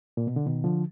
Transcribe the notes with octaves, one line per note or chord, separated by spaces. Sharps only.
A#2
B2
D3
B2 D#3
D3 F3